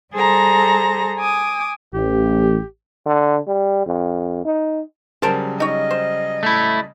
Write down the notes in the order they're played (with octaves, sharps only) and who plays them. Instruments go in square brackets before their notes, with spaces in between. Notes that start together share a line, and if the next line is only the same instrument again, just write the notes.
[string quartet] G3 G#4 A4 C5 A#5 A#6
G#5 D6 D#6
[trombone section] A1 [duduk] G4
[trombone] D3
G3
F2
D#4
[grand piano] C#3 F#3 G3 [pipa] A#4 C5 A5
[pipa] D#4 C#5 [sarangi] D#5
[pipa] C5
[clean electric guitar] A3 E4